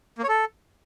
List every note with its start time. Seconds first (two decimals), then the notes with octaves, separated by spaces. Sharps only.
0.18 A#3
0.23 C#5
0.28 A4